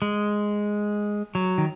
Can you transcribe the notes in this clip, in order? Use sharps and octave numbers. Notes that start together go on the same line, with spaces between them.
G#3
F#3
D#3